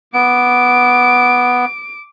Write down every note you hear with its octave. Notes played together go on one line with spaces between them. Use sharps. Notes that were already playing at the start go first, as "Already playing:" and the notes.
B3 D6 D7